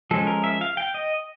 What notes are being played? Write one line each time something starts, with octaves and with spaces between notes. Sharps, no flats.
F3 G#3 C#4 A4
A#4
E5
F5
G5
D#5